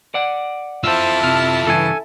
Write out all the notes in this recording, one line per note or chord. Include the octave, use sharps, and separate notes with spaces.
D5 F#5
E4 F4 A4 C5 A5 E6
C3 F6
G2 C#3 E3 A4 G#5